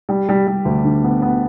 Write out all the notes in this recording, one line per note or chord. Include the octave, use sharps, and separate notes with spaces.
G3
G3
G3
D2
D3
B3
B3